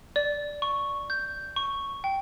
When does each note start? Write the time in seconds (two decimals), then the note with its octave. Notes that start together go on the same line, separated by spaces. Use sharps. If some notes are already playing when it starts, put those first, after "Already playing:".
0.16 D5
0.62 C#6
1.10 G6
1.56 C#6
2.04 G5